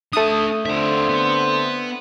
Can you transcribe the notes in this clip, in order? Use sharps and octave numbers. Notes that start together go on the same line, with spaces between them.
A3 D4 E5 D#6
D3 C4 F4 E5
B3